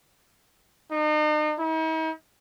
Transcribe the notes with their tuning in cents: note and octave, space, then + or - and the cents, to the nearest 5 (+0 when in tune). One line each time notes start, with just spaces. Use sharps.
D#4 -40
D#4 +45